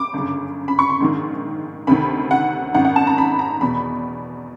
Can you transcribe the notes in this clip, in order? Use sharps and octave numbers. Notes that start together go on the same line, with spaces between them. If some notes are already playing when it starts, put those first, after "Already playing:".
Already playing: D6
G1 F#2 C#3
B5
C#6
C6
A#1 G#2 D#3
D2 C3 D#3 B5
F#5
G#1 F#2 D#3 F#5
F#5
A5
A#5
B5
A#5
E2 B2 B5